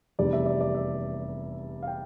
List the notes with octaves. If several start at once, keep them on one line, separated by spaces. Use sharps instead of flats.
F1 E2 C3 G3 D5
E5
D5
D5
E5
F5
G5